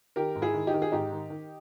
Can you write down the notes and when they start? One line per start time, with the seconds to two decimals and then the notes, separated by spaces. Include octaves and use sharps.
0.16 D#3 G4 A#4
0.35 G#2
0.42 E4 G#4
0.54 D#3
0.67 D#4 G4
0.74 D#3
0.82 G#4
0.92 G#2 D#4 G4
1.12 D#3
1.30 D#3